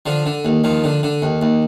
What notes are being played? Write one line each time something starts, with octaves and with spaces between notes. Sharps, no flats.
D3 F3
D3
D#2
D#2 F3
D3
D3
D#2
D#2